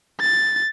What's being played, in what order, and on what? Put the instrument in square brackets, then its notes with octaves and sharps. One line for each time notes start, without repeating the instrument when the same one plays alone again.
[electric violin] A6